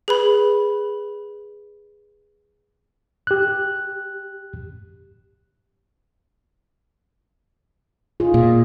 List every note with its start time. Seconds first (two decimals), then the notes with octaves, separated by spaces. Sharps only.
0.08 G#4 B4 B5
3.27 G4 F#6
8.20 F4 G#4
8.34 A#2